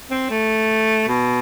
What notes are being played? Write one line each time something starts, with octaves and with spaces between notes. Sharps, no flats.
C4
A3
B2